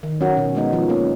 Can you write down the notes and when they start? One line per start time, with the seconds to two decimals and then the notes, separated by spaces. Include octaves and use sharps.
0.03 D#3
0.21 F#3 C#4 F#4 A#4
0.37 B2
0.55 G#3 B3 D#4
0.73 F3
0.89 A#3 C#4